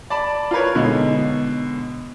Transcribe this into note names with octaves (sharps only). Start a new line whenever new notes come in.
D5 A5 B5
F4 A#4 B4 C#5
B2 D3 G#3 D#4